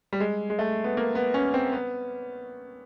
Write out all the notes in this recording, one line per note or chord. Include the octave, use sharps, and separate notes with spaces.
G3
G#3
G#3
A3
B3
A#3
B3
C#4
C4
B3